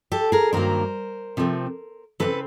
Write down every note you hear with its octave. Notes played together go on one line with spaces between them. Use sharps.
G4 A4
G#4 A#4
G2 D#3 F#3 A#3 A#4 C5
C3 F3 A3 C4
C#3 E3 A3 C4 A4 B4